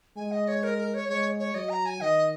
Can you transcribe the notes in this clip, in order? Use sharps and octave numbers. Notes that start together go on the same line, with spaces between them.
G#3 G#5
D#5
C#5
A#4
A#4
C#5
G#3 C#5
C#5
F#3 D#5
A#5
G#5
D#3 D#5